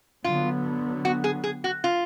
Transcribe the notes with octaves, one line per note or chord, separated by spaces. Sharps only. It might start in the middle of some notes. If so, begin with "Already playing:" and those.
D3 F#3 B3 F4
F#4
G#4
G#4
F#4
F4